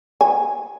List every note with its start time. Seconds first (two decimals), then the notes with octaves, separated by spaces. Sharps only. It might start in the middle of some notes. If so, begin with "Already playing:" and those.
0.21 G#5